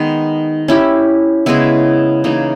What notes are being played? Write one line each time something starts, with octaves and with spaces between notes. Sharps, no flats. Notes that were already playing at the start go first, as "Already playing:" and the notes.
Already playing: D#3 G#3 B3 D#4
C#4 E4 G4
C#3 G#3 B3 E4
C#3 E3 A#3 D#4